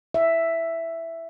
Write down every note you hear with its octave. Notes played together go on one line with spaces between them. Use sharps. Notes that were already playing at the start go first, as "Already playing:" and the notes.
E5